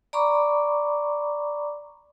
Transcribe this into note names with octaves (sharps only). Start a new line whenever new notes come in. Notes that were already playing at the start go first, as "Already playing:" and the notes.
D5 A#5 B5 C#6 D6